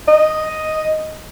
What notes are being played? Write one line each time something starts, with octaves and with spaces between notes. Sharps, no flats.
D#5